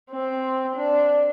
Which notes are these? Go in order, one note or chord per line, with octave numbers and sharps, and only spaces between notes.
C4
D4